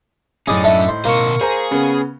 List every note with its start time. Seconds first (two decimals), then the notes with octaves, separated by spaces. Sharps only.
0.47 F#2 A2 C#4 D#4 G#4 D5 D#6
0.64 D4 A4 E5
0.89 C5
1.05 B2 A#3 A#4 C5 C#6
1.41 G#4 C5 A#5
1.71 C#3 B3 C#4